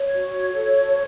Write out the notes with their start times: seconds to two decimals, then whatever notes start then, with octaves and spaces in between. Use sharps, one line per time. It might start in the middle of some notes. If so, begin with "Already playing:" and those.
Already playing: C#5
0.14 F#4
0.53 A4
0.92 C5